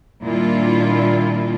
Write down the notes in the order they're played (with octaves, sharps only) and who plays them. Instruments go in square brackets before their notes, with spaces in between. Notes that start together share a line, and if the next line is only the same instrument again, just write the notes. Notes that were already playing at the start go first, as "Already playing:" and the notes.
[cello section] A#2 D#3 G3 D4 E4 F4